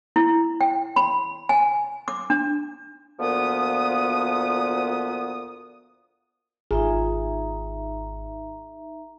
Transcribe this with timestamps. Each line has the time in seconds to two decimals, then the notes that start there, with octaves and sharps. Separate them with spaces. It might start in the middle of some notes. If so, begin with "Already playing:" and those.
0.16 E4
0.61 G5
0.96 B5
1.49 G#5
2.08 D6
2.30 D4
3.20 D2 A#2 F3 B3 D#6
6.71 G#1 D#4 F4 G#4 E5 A#5